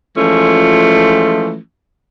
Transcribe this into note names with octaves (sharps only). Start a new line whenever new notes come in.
E3 F3 G#3 A3 C#4 F4